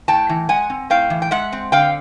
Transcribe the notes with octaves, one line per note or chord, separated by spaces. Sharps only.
A2 G5 A5
E3
G#3 F#5 G#5
C4
A2 F5 G5
E3
G5
G#3 E5 F#5
C4
D3 F5 G5